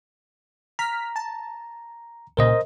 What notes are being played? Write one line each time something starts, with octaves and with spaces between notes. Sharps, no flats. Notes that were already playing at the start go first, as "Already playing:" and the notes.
A#5 F6 B6
A5
C2 A#2 C#3 A#4 C5 D#5